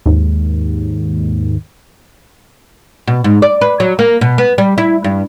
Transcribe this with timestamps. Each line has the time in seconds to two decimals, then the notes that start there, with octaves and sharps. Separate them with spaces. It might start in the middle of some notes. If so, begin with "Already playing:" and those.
0.06 D#2 G#2
3.07 B2
3.24 G#2
3.42 D5
3.61 B4
3.80 F#3
3.99 A#3
4.21 B2
4.38 B3
4.58 G3
4.78 E4
5.04 G2